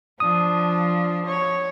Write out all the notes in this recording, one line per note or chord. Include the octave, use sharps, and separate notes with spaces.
F3 D4 D#6
C#5